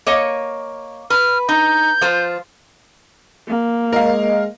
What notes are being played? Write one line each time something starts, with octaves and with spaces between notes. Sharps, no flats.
A#3 C#5 D#5
B4 F6
D#4 G6
F3 F4 C5
A#3
G#3 A#4 D#5 F5